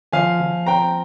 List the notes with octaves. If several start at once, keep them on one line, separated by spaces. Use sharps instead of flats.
F3 F5 G#5
F3
C4 G5 A#5